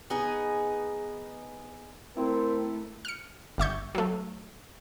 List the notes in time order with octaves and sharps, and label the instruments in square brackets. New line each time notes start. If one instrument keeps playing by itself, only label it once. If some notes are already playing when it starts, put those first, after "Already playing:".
[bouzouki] B3 D#4 G#4
[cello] A3 [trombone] C4 [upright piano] E4 [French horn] A#4
[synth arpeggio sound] F6 C#7
G1 E5 C#6 G6
F#3 A3